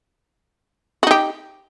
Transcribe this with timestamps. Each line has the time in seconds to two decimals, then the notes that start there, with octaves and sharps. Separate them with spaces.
1.03 F#4
1.07 D#4
1.11 G4